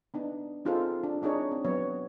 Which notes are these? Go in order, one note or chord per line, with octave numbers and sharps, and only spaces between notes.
B3 D4 D#4
C4 D#4 F4 G#4 A4 C5
D4
C4 D4 D#4 G#4 C#5
C4
F#3 B3 C#5